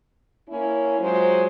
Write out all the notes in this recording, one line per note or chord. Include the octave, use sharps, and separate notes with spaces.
A#3 C#4 E4
F#3 G#3 F4 C5